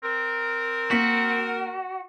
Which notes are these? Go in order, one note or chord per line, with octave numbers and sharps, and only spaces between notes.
C4 A#4
A#3 F#4 B6